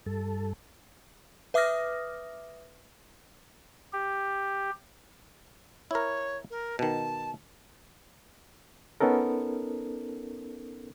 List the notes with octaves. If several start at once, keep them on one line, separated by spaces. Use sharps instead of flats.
G2 A4
B4 E5 D6 D#6 F6 A#6
G4
E4 A#4 C#5
A#4
B2 D#3 A5
B3 C#4 D#4 A4 A#4